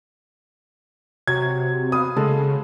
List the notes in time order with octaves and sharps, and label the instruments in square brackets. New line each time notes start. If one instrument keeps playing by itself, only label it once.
[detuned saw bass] C3 [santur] F#3 [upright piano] G#6
[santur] B3 F5 [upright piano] D#6
[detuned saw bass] C#3 [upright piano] G#3 [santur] A4